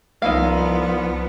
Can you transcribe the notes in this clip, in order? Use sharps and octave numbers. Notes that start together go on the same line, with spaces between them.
C2 F3 B3 D#4 E4 F5